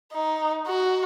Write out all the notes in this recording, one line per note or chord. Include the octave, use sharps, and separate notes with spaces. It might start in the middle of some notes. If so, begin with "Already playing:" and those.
D#4
F#4